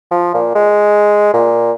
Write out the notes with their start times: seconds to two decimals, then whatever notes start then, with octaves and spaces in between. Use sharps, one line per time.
0.11 F3
0.34 A#2
0.55 G#3
1.34 A#2